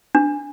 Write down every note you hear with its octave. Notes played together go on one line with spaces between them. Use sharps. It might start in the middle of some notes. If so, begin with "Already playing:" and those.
D4